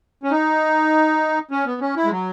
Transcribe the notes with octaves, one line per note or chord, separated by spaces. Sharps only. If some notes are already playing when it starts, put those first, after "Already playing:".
C#4
D#4
C#4
B3
C#4
E4
G#3
F#3